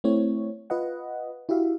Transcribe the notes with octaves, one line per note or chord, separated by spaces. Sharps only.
A3 C4 E4 C#5
F4 B4 D#5 F#5
E4 F#4 G4 E5 F5